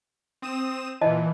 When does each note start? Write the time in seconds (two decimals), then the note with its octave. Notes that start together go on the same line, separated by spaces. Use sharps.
0.42 C4 D#6 E7
1.01 A#2 E3 D#5 A5